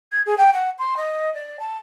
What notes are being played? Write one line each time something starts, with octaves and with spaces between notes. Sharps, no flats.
G#6
G#4
G5
F#5
C6
D#5
D5
A5